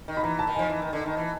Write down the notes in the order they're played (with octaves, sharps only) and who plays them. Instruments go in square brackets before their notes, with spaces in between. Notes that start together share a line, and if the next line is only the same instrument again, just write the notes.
[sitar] D#3
[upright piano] B5
[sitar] E3 [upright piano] A#5
[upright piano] A5
[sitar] D#3
[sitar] F3 [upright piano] G#5
[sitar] E3
D#3
D3
D#3
E3